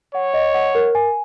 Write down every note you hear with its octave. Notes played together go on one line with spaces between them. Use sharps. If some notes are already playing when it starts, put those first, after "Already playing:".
C#5 F#5
D#5
F#5
A#4
G#5